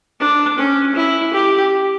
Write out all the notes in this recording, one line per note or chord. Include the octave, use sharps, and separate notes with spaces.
D4
C#4
E4
G4